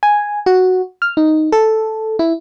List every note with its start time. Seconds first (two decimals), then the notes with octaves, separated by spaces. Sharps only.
0.03 G#5
0.46 F#4
1.02 F6
1.17 D#4
1.52 A4
2.19 E4